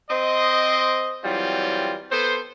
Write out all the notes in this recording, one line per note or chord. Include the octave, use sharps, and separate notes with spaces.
C4 C5 D#5
E3 F#3 G3 C4 F4
B3 A4 C5